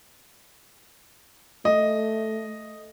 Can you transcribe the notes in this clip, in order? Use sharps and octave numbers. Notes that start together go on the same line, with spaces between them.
A3 D#5